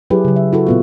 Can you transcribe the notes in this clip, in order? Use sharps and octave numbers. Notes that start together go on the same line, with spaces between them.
F#3 E4 G4 G#4 B4
C#3 F#3
E5
E4 F#4 A4
A#2 B3 F4